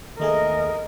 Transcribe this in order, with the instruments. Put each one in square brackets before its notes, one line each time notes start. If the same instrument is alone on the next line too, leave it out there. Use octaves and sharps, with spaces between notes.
[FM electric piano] D#2 A3 G#4 [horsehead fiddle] A#4 D#5